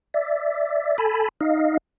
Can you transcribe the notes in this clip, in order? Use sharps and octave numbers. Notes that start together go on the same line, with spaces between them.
D5 E5
A4 G#5 A5 B5
D#4 D#5 F5